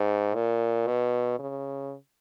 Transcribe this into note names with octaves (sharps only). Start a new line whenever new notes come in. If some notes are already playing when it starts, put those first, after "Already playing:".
Already playing: G#2
A#2
B2
C#3